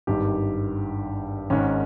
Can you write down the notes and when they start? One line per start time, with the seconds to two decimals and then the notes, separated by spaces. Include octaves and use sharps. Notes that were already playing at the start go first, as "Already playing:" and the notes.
0.07 G#1 G2 D#3 G4
1.50 G#1 G#2 D#3 C#4